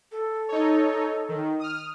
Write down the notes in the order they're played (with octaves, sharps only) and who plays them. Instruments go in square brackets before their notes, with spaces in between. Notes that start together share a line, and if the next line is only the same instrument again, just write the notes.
[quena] A4
[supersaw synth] D#4 C#5
D#3
D#6 F6